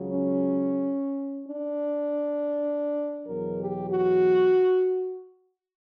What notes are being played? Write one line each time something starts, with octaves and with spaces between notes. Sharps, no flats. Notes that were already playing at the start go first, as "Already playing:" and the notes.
Already playing: C#2 C#3 F#3
C#4
D4
E2 B2 F#3 A#4
G4
F#4